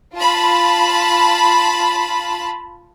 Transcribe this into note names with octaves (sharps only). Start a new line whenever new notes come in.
F4 A5 B5